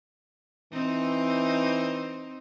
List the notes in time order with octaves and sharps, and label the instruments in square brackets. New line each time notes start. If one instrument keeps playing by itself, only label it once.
[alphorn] E3 [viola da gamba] C4 D#4